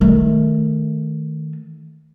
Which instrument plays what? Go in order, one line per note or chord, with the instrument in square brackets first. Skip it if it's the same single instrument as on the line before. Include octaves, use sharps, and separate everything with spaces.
[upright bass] D#3 A3